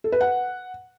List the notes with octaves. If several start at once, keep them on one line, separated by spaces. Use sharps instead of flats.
A4
B4
F#5